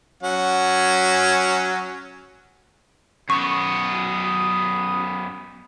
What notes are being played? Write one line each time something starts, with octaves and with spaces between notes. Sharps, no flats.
F#3 C#4 F#5
F#2 B3 C#6 D#6